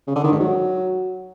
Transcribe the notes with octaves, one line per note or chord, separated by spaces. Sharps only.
C#3
D3
D#3
G#2
F#3